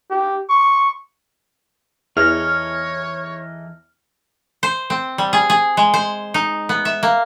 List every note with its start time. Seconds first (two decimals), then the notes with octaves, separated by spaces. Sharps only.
0.10 G4
0.49 C#6
2.17 E2 E3 D#4 A4 C#5 F6
4.63 C5
4.90 C4
5.18 G3
5.33 G#4
5.50 G#4
5.77 G#3
5.94 C5
6.34 D#4
6.69 B3
6.85 E5
7.03 A#3